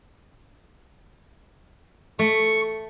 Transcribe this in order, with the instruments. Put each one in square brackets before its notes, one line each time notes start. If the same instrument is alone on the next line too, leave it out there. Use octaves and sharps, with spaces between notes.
[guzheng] A3 [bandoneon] C#6